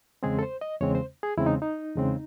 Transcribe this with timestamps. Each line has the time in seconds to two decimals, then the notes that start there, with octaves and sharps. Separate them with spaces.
0.23 E2 C#3 G#3 C4 G#4
0.39 A4
0.43 C5
0.61 D#5
0.81 E2 C#3 G#3 C4 C#5
0.95 C5
1.23 G#4
1.38 E2 C#3 G#3 C4 E4
1.46 D#4
1.62 D#4
1.96 E2 C#3 G#3 C4